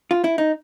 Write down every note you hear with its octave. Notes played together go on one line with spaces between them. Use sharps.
F4
E4
D#4